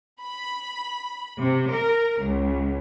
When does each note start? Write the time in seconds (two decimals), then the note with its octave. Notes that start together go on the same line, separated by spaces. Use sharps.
0.21 B5
1.40 C3
1.72 A#4
2.23 C#2